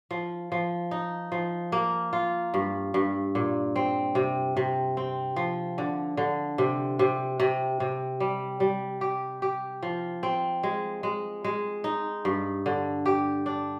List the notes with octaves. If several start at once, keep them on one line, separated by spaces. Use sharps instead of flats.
F3
F3
D#4
F3
A#3
F4
G2
G2
A#2
C4
C3
C3
C4
F3
D3
D3
C3
C3
C3
C3
G3
G3
G4
G4
F3
C4
G#3
G#3
G#3
D#4
G2
D3
G4
D4